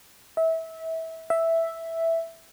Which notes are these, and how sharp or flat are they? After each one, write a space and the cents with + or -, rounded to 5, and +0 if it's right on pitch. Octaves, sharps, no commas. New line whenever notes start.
E5 -25
E5 +0